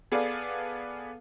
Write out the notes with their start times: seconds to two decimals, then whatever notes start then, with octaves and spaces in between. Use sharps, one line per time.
0.12 B3 G#4 A4 B4 D5 F5